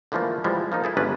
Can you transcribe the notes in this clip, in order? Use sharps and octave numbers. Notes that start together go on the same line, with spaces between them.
D3 E3 F3 A3 A#3
E3 F3 G3 G#3
F3 A#3 D#4
E4 G#4 A4
G1 G#3 C#4 D4 B4